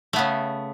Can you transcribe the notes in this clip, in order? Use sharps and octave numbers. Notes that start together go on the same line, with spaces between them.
C#3 A3 B3